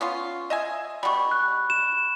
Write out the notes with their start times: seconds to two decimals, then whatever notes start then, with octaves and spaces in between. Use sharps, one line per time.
0.01 B3 C#4 F4
0.50 D#5 E5 G#5
1.03 B2 G3 B5 C#6
1.31 F#6
1.70 E7